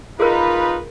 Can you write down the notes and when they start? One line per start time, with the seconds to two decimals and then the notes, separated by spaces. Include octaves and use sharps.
0.20 D#4 F4 G#4 A#4 B4